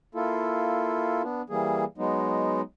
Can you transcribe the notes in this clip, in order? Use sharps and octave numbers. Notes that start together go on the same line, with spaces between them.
A#3 E4 F4 A4
B3 D4
E3 G3 A#3 G#4
F#3 G#3 B3 D#4